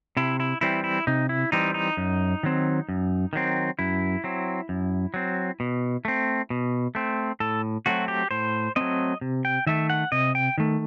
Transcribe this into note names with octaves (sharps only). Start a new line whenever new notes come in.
C3 E4
E4
E3 G3 C4 E4
E4
C3 D#4
E4
E3 G3 C4 D#4
D#4
F#2
D#3 F#3 C4
F#2
D#3 F#3 C4
F#2 E4
F#3 C4
F#2
F#3 C4
B2
A3 C4
B2
A3 C4
A2 A4
F#3 A3 C4 F#4
G4
A2 C5
F#3 A3 C4 D#5
C3
G5
D#3 A3 E5
F#5
C3 D#5
G5
D#3 A3